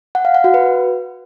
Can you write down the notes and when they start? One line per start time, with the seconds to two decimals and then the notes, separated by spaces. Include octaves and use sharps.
0.15 F#5
0.25 F5
0.34 F#5
0.44 F#4
0.54 B4